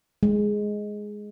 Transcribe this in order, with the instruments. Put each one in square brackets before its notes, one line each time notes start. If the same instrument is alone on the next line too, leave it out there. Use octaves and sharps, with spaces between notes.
[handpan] G#3